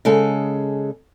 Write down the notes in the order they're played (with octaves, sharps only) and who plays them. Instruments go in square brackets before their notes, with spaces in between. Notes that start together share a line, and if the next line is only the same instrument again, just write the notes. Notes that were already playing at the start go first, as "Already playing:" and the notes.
[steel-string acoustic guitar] C#3 G#3 A4